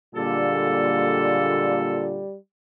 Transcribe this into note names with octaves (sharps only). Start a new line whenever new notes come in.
A#2 D3 G3 G#3 A#3 F4 A4